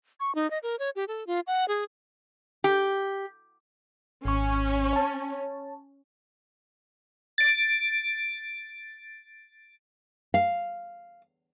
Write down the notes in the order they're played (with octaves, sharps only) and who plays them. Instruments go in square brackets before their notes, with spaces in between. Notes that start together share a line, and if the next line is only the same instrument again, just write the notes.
[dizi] C#6
D#4
D#5
A#4
C#5
G4
A4
F4
F#5
G#4
[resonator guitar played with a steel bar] G4
[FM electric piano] G#1 C#6 [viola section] C#4
[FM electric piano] C#5 A5
[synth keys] A6 D7
[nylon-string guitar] F5